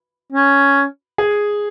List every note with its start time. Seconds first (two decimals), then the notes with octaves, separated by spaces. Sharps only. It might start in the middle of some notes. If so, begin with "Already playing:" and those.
0.33 C#4
1.18 G#4